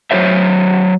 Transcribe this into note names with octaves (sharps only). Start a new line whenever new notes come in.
F#3 F#4 C5 C#5 E5